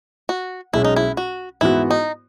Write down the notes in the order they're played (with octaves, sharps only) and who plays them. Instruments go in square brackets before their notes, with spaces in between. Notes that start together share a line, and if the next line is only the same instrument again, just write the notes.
[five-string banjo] F#4
[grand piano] B1 B2 G#3 C#4 [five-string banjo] E4
[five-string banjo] D#4
E4
F#4
[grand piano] G#2 E3 B3 F#4 [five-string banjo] E4
[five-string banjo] D#4